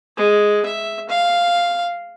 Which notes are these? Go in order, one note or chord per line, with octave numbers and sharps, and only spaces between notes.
G#3
E5
F5